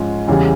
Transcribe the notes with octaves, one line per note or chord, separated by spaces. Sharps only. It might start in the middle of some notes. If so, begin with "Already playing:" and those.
Already playing: G#2 F3 C#4
E2 C#3 E3 G3